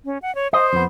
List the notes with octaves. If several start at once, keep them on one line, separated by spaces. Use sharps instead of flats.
C#4
F#5
C#5
C5 D#5
F2 B3